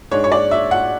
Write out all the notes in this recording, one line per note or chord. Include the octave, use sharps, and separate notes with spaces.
G#2 G#3 D4 C#5
C#5
D5
E5
F#5